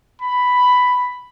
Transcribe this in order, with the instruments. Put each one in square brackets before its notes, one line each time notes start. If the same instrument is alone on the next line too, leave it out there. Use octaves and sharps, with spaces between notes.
[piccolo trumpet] B5